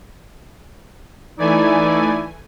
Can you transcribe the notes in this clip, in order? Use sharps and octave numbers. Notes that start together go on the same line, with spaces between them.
E3 A3 D#4 E4 D5 G#5